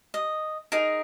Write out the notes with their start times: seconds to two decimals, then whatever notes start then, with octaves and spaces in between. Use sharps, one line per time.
0.14 D#5
0.72 D#4 G#4 A#4